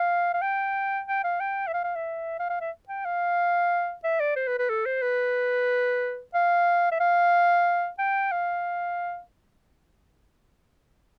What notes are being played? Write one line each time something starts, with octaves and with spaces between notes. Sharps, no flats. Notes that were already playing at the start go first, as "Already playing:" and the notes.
Already playing: F5
F5
G5
G5
F5
G5
E5
F5
F5
E5
F5
F5
E5
G5
F5
E5
D5
C5
B4
B4
A4
C5
B4
F5
E5
F5
G5
F5